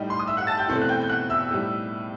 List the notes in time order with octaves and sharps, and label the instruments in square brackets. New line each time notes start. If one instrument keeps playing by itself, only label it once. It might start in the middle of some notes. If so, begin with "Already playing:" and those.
Already playing: [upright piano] A2 G3 D#4 G5
C6
D#6
E5 E6
F#5 F#6
A5 A6
G5 G6
E2 B2 A3 C4 E4
F#6
G5 G6
G6
F#5 F#6
E5 E6
A2 G3 D#4